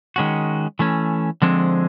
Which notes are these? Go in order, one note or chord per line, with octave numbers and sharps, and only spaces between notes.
D#3 G#3 C#4 F#4
E3 A3 C#4
D3 F3 G#3 C4